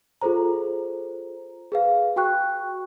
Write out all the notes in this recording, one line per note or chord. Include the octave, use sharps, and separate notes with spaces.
F4 G#4 A4 C5 A#5
G#4 B4 F5
F#4 G5 C#6 F#6